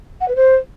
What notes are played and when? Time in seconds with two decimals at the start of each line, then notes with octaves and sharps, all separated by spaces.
0.21 F#5
0.28 B4
0.36 C5